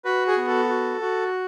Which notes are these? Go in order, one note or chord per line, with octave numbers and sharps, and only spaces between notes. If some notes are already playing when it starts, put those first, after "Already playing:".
F#4 B4
G#4
B3
A4
F#4
F#4